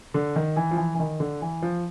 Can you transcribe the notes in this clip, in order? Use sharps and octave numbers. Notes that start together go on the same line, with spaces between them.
D3
D#3
E3
F3
E3
E3
D#3
D3
E3
F3